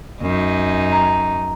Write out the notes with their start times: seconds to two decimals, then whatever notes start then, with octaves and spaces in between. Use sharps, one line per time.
0.22 F#2 D#4
0.92 A#5